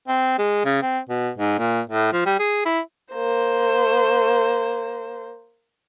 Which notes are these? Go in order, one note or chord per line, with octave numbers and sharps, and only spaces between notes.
C4
G#3
C#3
C4
B2
G#2
A#2
A2
F3
G3
G#4
E4
A#3 C5